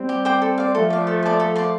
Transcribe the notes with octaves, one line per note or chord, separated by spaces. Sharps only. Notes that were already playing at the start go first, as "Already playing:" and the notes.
Already playing: G3 C4
G4
C5 G5 D6
A4
D5 F5
F3 A3 A4
D5 F5
A4
D5 A5 C6
A4
D5 A5 C6